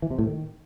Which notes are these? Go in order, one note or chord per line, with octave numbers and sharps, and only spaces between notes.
E3
C3
A2
D#3